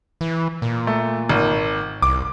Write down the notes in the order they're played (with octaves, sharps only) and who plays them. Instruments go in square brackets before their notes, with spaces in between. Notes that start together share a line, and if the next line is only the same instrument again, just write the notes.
[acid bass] E3
A#2
[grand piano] A3
G#1
[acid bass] C2 [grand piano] D6